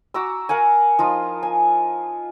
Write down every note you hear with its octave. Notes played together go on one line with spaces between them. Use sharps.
F#4 A#5 D6 E6
A#4 F5 F#5 G#5
F3 D#4 F4
G#5